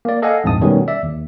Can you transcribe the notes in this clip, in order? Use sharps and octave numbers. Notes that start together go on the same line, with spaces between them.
A#3 D5
A4 D#5 F5 F#5 G#5
A#1 F2 G#2 G#3 A5 D#6
B2 D#3 G3 A3 B3 C#4
D5 E5
D#2